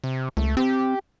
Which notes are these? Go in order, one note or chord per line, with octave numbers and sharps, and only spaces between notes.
C3
C#2 A3
C4 G4